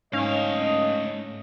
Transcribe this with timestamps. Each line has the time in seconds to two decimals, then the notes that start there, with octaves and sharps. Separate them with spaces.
0.13 G#2 A3 C#4 D#5 F5